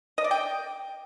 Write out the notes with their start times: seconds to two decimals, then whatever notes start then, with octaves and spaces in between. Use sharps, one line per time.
0.18 D#5
0.24 D5
0.31 G5